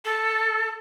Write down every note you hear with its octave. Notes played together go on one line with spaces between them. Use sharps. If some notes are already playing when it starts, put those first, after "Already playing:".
A4